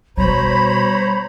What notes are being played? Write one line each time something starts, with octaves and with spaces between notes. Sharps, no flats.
B2 G3 C5 C#5 A#5 B5